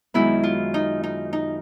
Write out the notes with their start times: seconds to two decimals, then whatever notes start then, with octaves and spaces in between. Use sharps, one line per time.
0.14 F#2 D#3 G#3 B3 E4
0.43 F4
0.74 D#4
1.03 D#4
1.33 D#4